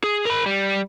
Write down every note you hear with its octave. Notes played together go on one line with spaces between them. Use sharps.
G#4
A#4 B5
G3